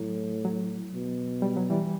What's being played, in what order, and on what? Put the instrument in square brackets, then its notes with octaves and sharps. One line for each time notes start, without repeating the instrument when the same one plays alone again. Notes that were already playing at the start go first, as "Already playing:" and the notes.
Already playing: [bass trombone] A2 [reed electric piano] F#3
[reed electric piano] F#3
[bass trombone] B2
[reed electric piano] G3
F#3
E3 G3